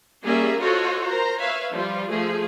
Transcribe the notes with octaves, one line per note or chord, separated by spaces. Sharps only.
G3 A#3 C#4 G#4 A#4 E5
F4 F#4 A4 C5 C#5 D#5
A#4 C5 A#5
B4 C#5 E5 F5
F3 G3 F4
F3 A3 G#4